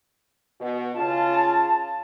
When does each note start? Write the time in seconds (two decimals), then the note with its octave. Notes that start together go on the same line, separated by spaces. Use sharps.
0.60 B2
0.94 C#3 F4 A5